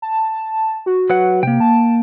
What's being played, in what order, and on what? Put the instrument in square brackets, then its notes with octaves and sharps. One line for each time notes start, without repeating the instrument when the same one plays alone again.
[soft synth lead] A5
F#4
[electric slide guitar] F#3 B4 F#5
[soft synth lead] C3 [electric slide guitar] A#3 G5
[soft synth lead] A5